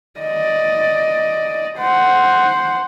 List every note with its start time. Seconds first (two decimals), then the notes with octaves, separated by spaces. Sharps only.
0.20 D5 D#5
1.77 C5 F#5